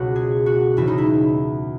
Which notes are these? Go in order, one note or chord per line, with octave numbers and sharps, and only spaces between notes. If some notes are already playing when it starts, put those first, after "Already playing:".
Already playing: C#2 B2 F#4
G#4
F#4
E2 C#3 E3 E4
D#4
E4